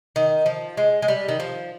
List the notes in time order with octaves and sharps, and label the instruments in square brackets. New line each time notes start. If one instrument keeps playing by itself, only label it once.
[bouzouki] D#3
F3
G#3
G#3
G3
D#3
F3